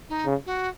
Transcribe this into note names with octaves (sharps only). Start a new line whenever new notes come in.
D#4
C#3
F#4